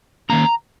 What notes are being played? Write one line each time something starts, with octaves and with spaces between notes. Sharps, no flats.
D#3 A#3 C#4 A#5